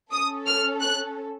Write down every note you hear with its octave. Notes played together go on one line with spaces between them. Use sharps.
C#4 A4 D#6
F6
F#6